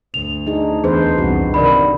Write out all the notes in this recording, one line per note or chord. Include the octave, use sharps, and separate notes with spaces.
D2 F7
D4 D#4 G#4
E2 D4 G#4 B4 C5
C2 F2 F#4
C3 D#3 A#4 D5 B5